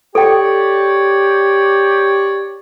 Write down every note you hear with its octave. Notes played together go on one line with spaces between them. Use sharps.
G4 A4 C#5 D5 G5